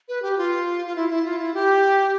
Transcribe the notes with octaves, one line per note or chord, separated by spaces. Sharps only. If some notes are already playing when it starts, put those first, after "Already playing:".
B4
G4
F4
F4
E4
E4
F4
E4
G4